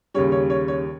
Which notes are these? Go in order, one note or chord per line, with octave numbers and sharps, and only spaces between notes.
D#2 C#3 G3 C#5
C#5
C#5
C#5